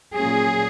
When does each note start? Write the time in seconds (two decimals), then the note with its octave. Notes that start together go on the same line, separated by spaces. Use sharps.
0.17 A#2 F#3 A#3 C#4 G#4